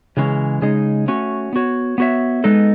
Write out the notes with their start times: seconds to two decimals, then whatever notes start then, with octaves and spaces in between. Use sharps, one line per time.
0.17 C#3 E3 G#3 C#4
0.62 C#3 G#3 D#4 G#4
1.08 A3 C#4 F#4
1.53 B3 F#4 C#5
1.98 B3 F#4 C#5 E5
2.44 G#3 B3 D#4 A4